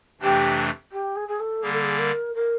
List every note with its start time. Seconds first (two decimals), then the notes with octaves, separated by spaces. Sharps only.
0.21 F2 C3 E3 A3 D4 G4
0.91 G4
1.15 G#4
1.27 G#4
1.39 A4
1.62 D3 G3 A#3 G#4
1.72 A4
1.82 G#4
1.98 A#4
2.34 A#4